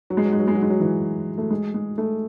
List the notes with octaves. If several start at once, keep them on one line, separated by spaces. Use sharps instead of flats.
F#3
G#3
F#3
G#3
F#3
G#3
F#3
G#3
F#3
E3
A3
G#3
G#3
A3